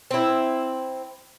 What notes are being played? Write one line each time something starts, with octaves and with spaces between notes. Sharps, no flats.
C4 E4